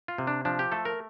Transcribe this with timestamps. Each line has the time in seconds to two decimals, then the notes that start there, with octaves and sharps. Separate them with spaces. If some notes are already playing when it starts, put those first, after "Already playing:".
0.08 F4
0.18 C3
0.27 D4
0.45 F3 D4
0.59 G4
0.72 A3 A4
0.85 A#4